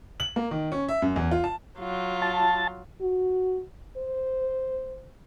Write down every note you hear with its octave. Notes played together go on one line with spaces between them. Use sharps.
F#7
A#3
D#3
C#4
E5
F#2
E2
F4
A5
F#3 F4
A5
F#4
C5